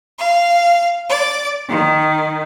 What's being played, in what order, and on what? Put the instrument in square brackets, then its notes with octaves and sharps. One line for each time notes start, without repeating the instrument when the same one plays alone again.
[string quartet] F5
D5
D#3